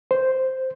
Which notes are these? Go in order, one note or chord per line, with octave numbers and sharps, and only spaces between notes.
C5